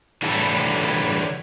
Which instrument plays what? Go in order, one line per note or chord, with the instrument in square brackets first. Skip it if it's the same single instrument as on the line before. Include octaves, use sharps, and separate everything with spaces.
[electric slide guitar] D3 E3 F#3 G3 E4 A4